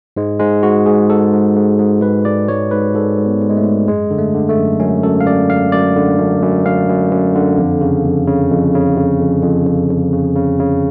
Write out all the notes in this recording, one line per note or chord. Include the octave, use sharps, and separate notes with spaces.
G#2 G#3
G#2 G#3
G#2 F#4
G#2 G#4
G#2 A4
G#2
G#2
G#2
G#2 B4
G#2 D5
G#2 C#5
G#2 B4
G#2 A4
G#2
B3
G#2
G#3
A3
G#2
F#2 G#3
D3
A3
D3
A3
F#2
F#2 C#4
F#2 A4
F5
F#2 D5
F#2 F5
F#2 D5
D3
F#2
F#2
F#2 F5
F#2
F#2
D3
F2
C#3
F2
C#3
F2
C#3
C#3
F2
F2
F2
F2
C#3
C#3
C#3